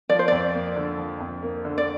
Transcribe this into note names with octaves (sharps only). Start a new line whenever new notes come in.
F3 D5
C5
F2 D5
A#3
D3
F3
F2
A#3
D3
D5